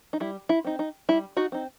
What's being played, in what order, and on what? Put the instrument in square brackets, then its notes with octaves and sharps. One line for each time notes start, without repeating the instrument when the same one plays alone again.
[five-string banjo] D#4
G3 E4
E4
C4 D#4
D#4
G3 E4
D#4 F#4
C4 D#4